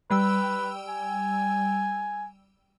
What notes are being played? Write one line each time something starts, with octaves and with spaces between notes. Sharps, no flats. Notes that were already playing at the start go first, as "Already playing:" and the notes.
G3 B4 G5 E6
G#5